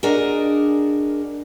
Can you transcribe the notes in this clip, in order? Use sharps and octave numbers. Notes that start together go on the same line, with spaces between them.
D4 F#4 G#4 A#4 D#5